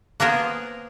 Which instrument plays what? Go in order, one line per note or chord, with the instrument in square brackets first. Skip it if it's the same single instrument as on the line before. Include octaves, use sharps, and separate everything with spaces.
[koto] A#3 B3 G#4 A#4 C5